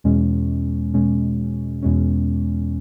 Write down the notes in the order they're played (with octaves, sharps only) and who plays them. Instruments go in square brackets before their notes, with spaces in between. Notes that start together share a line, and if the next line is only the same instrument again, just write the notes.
[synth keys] E2 B2 G#3 C#4
E2 B2 G#3 C#4
E2 B2 G#3 C#4